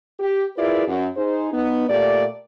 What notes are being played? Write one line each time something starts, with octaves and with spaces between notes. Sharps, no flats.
G4
E4 F4 G#4 A#4 B4 D5
F#2
D#4 G#4 C5
B3 D#4
A#2 A3 G4 D5